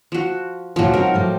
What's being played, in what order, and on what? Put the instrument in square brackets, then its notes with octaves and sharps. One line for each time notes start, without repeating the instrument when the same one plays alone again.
[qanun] F3 F#4
[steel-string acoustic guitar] D2 A#2 [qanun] F3 F#3
[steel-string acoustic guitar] C4 D#4 F#4 [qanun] A#4
[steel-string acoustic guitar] A2 F3 G3